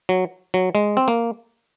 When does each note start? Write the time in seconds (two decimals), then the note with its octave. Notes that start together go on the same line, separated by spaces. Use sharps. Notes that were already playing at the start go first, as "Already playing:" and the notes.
0.09 F#3
0.54 F#3
0.75 G#3
0.97 C4
1.08 A#3